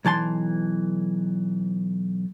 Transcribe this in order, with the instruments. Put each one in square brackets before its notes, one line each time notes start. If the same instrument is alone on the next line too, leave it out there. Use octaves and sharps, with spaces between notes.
[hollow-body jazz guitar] B1 E3 A5 C6